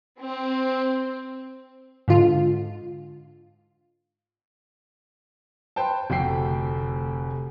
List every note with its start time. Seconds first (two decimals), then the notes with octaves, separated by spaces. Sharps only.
0.21 C4
2.08 G#2 D3 F4
5.76 B4 C5 G5 A5
6.10 F1 D2 F#4 G5 C7